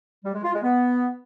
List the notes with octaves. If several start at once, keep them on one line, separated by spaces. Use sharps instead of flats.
G3
G#3
F4
G#3
B3